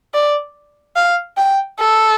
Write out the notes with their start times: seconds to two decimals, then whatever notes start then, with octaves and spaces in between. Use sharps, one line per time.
0.14 D5
0.96 F5
1.37 G5
1.80 A4